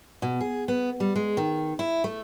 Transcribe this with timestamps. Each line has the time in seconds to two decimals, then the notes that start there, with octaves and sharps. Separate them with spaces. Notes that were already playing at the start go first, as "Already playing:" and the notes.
0.22 B2
0.41 G#4
0.68 B3
1.00 G3
1.16 G#3
1.37 D#3
1.79 E4
2.04 A3